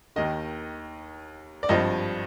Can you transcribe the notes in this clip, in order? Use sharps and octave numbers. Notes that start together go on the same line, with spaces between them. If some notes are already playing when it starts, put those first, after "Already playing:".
D#2 D#3 D#5
D5
G#1 G2 F3 D#5